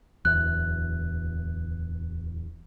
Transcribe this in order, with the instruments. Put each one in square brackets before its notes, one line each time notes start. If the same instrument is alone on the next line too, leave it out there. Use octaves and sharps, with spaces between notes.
[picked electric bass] D1 E2 [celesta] F#6